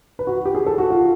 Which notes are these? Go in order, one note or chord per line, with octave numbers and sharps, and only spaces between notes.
B4
F#4
G4
G#4
A4
F#4
F4